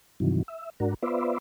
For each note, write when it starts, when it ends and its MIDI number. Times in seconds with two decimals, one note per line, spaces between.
0.20 0.43 43
0.20 0.43 48
0.20 0.43 51
0.20 0.43 52
0.20 0.43 54
0.48 0.70 76
0.80 0.94 44
0.80 0.94 62
0.80 0.94 66
0.80 0.94 70
1.02 1.38 59
1.02 1.38 65
1.02 1.38 71
1.02 1.38 72
1.02 1.38 74
1.02 1.38 76